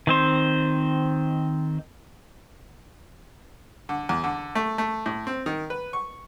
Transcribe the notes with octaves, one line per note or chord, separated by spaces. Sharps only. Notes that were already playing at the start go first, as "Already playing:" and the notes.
D#3 C4 C5
D3
E2
D3
A3
A3
A2
C4
D#3
B4
C#6